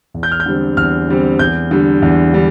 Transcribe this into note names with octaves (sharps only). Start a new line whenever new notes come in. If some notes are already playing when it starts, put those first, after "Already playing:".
E2
G6
F6
G6
D3 G3 C4
E2 F6
D3 G3 C4
E2 G6
D3 G3
E2
D3 G3